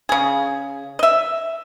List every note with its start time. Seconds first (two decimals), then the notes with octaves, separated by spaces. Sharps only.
0.09 C#3 G#4
0.99 D#5 E5